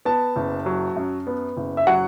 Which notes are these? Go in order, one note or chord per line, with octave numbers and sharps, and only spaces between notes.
B3 A5
F#1
F#3
F#2
B3
F#1
E5
F#3 F#5